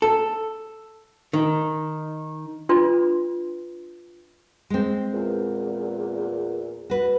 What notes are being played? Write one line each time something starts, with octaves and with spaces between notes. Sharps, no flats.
A4
D#3
D4 F4 B4 C6
G#3 C4
E2 A#2
F#4 B4